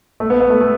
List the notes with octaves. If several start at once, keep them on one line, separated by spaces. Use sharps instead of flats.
A3
B3
B3
A3
A3